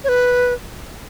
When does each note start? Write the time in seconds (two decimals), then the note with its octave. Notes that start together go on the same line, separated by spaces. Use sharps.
0.04 C#5
0.09 B4